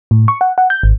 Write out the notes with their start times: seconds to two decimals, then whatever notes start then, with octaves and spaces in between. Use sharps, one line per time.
0.11 A2
0.28 C#6
0.41 F#5
0.58 F#5
0.70 G6
0.83 G#1